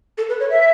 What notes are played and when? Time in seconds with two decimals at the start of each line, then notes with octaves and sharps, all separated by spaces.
0.18 A4
0.29 B4
0.40 C#5
0.50 E5